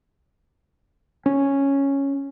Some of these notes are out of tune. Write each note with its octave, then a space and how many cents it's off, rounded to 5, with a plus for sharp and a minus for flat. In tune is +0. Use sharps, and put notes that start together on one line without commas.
C#4 -5